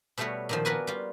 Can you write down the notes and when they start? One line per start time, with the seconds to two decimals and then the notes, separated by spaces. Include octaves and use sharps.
0.18 B2 G3 A3 B3 F#4 C#5
0.49 A#2 D#3 F3
0.65 B3 F#4 A#4 B4 D5 G#5
0.87 G3 F4